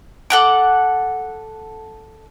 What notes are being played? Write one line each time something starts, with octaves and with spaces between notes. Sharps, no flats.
A4 F#5 D6